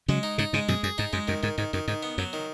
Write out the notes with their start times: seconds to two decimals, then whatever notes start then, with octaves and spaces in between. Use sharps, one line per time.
0.08 C#3 F#3 G#3
0.23 D#4
0.38 G#2 C#3 D#4
0.53 G#2 C#3 G#3
0.68 F#2 B2 G#4
0.83 F#2 G#4
0.98 G#2 D#4
1.13 F#2 G#3
1.28 F#2 D#3
1.43 G#2 D#3
1.58 G#2 D#3
1.73 F#2 D#3
1.88 G#2 D#3
2.03 B3
2.18 F#2 F#3
2.33 D#3